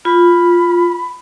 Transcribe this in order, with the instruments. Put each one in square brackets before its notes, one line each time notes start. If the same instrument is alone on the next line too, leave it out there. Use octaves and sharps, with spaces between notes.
[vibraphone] F4 [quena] B5